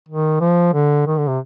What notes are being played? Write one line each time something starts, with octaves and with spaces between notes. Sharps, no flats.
D#3
F3
D3
D#3
D3
C3